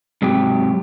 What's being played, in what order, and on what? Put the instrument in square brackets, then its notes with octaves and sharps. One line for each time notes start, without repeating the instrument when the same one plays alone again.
[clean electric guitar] G#2 C3 F#3 G4